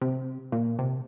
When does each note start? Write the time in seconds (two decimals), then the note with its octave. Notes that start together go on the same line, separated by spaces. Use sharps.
0.01 C3
0.52 A#2
0.79 C3